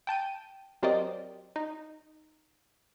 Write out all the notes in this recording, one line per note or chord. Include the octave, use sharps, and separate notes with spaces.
G5 A5 G6 D#7
F#3 C4 G4 A#4 D5 D#5
D#4